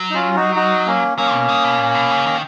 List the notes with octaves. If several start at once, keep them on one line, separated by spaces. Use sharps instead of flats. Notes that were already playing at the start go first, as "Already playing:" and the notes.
Already playing: F#3
D#4
C#4 F4
D#4 F#4
D#4 F#4
A#3 C#4
F#3 A#3 C#4
B2
D#3
B2
A#2
B2
C#3
D#3